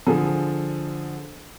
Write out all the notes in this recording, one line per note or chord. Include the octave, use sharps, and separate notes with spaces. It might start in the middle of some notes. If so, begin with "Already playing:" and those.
D3 F3 G#4 A4